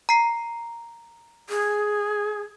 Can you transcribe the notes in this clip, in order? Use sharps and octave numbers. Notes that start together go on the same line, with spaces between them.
A#5 C7
G#4